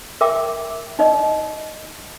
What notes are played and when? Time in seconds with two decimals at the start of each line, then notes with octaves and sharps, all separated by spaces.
0.21 A#4 E5 G5 D6
0.99 D#4 D5 D#5